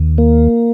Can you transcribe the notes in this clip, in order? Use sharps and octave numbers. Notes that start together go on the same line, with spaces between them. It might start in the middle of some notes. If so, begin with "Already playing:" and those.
Already playing: D#2
A#3